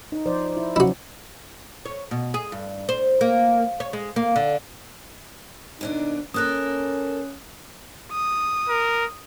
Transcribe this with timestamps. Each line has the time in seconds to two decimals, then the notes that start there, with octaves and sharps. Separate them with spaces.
0.12 D#4
0.26 F3 C5 D5
0.57 E4
0.76 F3 F#3 C#4 E4 F#4
1.85 C#5
2.11 B2
2.34 G#4
2.52 G2
2.89 C5
3.21 A#3
3.80 C#5
3.93 G#3
4.16 A#3
4.36 D3
5.81 D#2 B2 D4 D#4
6.34 A#3 C#4 A4 A#4 D#6 F#6
8.12 D#6
8.69 A#4